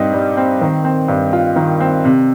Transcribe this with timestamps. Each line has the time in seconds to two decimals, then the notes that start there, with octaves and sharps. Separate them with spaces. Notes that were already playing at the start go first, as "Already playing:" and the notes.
Already playing: G2 G3 C4 D#4
0.13 G3
0.37 C4
0.61 D#3
0.85 C4
1.08 G2
1.33 F4
1.56 D#3
1.80 C4
2.04 C3